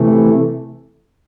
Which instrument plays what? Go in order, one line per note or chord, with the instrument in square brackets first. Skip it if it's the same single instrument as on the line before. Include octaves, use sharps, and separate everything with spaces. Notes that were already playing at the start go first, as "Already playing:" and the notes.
Already playing: [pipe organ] C3 E3 A3